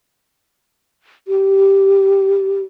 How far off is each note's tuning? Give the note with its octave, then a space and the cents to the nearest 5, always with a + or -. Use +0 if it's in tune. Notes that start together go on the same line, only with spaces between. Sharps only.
G4 -5